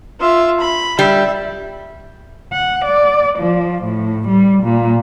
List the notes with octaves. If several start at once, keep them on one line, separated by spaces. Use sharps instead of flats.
F4 E5
B5
G3 E5
F#5
D5
F3
A2
G3
A#2